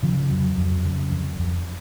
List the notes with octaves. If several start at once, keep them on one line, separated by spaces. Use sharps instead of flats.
C#3 F3
F2 F#3
F2
C#3
F2
F2